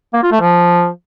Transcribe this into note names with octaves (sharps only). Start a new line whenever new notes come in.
A#3
F4
A3
F3